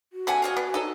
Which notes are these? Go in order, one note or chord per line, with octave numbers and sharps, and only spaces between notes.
F#4
D3 G3 C4 E5 F#5 G#5
F4 C#5 D#5
B3 D4
D#4 A4 C#5 D#5